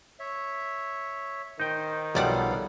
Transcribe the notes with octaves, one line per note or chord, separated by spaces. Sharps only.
C#5 E5
D#3 D#4 C5 G5
B1 F3 G3 B3 A4 D5 F5 F#5